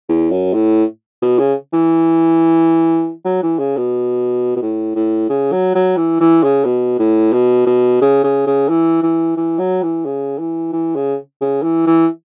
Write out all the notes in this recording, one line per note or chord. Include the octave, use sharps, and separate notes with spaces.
E2
F#2
A2
B2
C#3
E3
F#3
E3
C#3
B2
B2
A2
A2
C#3
F#3
F#3
E3
E3
C#3
B2
A2
B2
B2
C#3
C#3
C#3
E3
E3
E3
F#3
E3
C#3
E3
E3
C#3
C#3
E3
E3